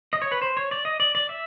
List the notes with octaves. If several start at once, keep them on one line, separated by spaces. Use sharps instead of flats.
D#5
C#5
B4
C5
C#5
D5
D#5
D5
D5
E5